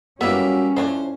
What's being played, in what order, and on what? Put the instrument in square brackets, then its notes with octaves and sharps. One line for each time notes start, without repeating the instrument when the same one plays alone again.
[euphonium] F#3 [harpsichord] G3 A#3 E5 [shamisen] B3 E4 [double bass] C#4
[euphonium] A2 [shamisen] F3 D4 C#5 [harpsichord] C5